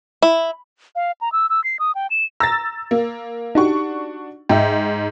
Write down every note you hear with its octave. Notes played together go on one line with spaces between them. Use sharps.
E4
F5
A#5
E6
E6
C7
D#6
G5
E7
A#5 E6 A6 A#6
A#3
D4 D#4 F#4 G4 C#6
G#2 E5 G5